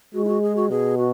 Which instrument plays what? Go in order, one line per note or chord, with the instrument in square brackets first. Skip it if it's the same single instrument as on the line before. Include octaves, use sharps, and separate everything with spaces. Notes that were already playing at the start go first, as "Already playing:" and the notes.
[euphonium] G#3 [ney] F#4
[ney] E4
F#4
G#4
F#4
[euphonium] B2 [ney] G#4
[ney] F#4